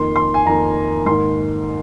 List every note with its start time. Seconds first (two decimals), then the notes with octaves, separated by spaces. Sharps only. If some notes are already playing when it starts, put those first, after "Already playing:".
Already playing: F2 D#3 A#3 C6
0.16 C6
0.34 G#5
0.45 F2 D#3 A#3 A#5
1.06 G#2 D#3 A#3 C6